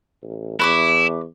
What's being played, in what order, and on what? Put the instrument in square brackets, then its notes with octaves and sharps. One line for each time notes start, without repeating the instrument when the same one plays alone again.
[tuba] A1
[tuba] E2 [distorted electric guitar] E4 [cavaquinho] B4 C#6 D6